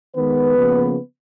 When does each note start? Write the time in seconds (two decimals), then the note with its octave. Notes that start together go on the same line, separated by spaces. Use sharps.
0.16 D#3 G#3 B3 B4
0.56 C#3 F3 A#3